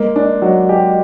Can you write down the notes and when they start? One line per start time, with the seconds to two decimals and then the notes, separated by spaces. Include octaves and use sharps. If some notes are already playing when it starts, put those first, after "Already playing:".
Already playing: G#3 A#3
0.16 D4
0.42 F#3
0.69 G4